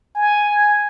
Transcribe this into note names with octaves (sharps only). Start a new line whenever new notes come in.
G#5